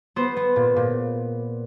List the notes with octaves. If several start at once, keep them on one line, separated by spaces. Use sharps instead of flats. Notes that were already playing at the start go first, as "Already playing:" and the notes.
B3 C5
B3
A#2
A#2